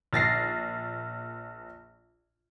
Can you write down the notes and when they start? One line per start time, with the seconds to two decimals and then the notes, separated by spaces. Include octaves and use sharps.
0.13 A#1 A6 A#6 C7